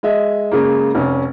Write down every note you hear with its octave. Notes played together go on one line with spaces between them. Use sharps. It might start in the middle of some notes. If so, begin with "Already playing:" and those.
G#3 D#5 E5
C#3 G#3 A#3
F1 C#4